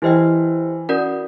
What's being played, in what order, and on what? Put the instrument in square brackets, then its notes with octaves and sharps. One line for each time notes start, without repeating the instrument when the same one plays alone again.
[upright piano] E3 [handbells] E4 G4 C5 D#5 G5
[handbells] C#4 F#4 A#4 D5 F#5